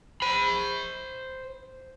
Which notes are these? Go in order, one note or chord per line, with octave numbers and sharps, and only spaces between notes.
C5 B5